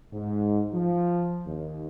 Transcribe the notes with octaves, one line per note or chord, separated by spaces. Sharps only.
G#2
F3
D#2